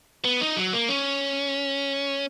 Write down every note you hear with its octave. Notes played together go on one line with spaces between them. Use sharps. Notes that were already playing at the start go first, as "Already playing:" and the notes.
B3
D#4
F#3
A#3
C#4